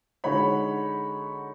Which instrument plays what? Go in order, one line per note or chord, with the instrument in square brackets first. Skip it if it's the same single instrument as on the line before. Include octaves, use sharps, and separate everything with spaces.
[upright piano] D3 G#3 D#4 F#4 C#5 B5